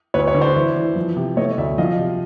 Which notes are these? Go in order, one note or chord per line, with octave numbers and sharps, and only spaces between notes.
D2 B4 C#5
B4 C#5
D3
C5 D5
E3
E3
F3
C3
A3 C#5 D#5
D2 D5 E5
F3 D#5 F5
C3